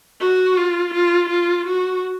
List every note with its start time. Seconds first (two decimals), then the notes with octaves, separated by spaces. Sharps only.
0.21 F#4
0.57 F4
0.94 F4
1.29 F4
1.66 F#4